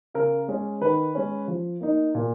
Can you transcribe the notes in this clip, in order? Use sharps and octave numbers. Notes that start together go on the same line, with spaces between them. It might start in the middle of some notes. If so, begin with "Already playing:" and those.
C#3 A#4
G#3 C#4
D#3 B4
G#3 C#4
F3
A#3 D#4
A#2